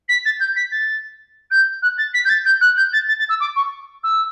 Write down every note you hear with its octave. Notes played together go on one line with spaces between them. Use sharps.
B6
A6
G6
B6
A6
G6
F#6
A6
B6
G6
A6
G6
F#6
G6
A6
A6
A6
E6
D6
C#6
E6